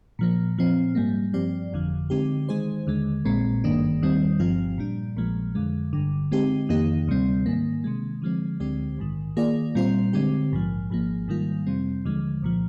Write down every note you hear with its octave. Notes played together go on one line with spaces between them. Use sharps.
A#2 F3 A#3
A#2 F3 C4
G#2 G3 A#3
G2 F3 C4 G4 D5
G1 F2 D3 F3
D3 G#3 C4 D#4 G4
D#3 G#3 D#4 G#4 C5
D#2 D3 G#3
A#1 A#2 G#3 C4
G#1 G2 D#3 A#3 D4
D#2 D#3 G3 C4
G1 G2 F3 C4 F4
A#2 G3 D4
A#1 A#2 F3 G#3
F2 D3 G#3
G1 G2 D3
D3 G#3 C4 D#4 G4
F2 D#3 A#3 D#4 G4
D2 C3 G3 C4
G#2 D#3 A#3
C3 D#3 G#3
D3 F3 G#3 C4
D2 D3 G#3 C4 G4
A#1 G#2 D#3
D#3 A#3 F4 G#4 D5
A#2 G3 C4 F4 C5
D3 G#3 C4 G4
A#1 G#2 F3
G#1 G#2 F3 A#3
G#2 D#3 G3 A#3 F4
F2 C3 G3 C4
D#2 D3 F3 G#3
C2 A#2 F3